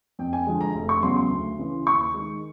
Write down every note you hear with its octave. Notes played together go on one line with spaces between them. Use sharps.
F2 G5
G#5
D3 F3 G#3
A#5
F1
C#6
E2 C#3 F#3 C6
C6
D2
C#3 E3
D#2 C#6
D#3 G#3